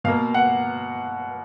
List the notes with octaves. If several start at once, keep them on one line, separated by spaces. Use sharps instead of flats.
B2 A#3 F5
F#5